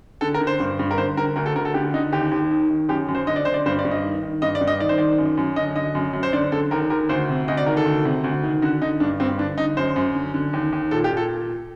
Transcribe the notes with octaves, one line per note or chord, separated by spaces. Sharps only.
D3 A4
A#4
D3
C5
G2
G2
A#4
D3 C5
D3 A#4
D2 A#4
A4
D2 A#4
A4
D3 G4
D3 D#4
D#2 G4
D#2
D#3
D#3
F#2 G4
F#2
C5
D3 D#5
D5
D3 C5
D5
G2 C5
D5
G2
D#5
D#3
D#3
G2 D#5
D5
G2
D#5
D#3 D5
C5
D#3 D5
F#2
F#2
D3 D#5
D3 D#5
F#2
F#2
C5
D3 D5
D3 A4
D#2 A#4
D#2 A#4
D2 C5
C3
D2 D#5
D5
D#3 A#4
A4
D2
C3
D2
D#3
D3 F#4
D3 D#4
G2 D4
G2 C4
D3 D4
D3 D#4
F#2 C5
F#2
D3
D3
D#2
D#2
A#2 A4
G4
A#2
A4